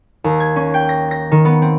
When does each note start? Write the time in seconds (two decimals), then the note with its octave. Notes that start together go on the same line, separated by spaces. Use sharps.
0.24 D#2
0.40 G#6
0.56 C#4
0.74 G5
0.89 A#6
1.11 A#6
1.32 D#3
1.45 B3
1.62 C4